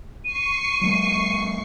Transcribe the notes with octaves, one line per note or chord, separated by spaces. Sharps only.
C#6 C7 D#7
F#3 G#3 A#3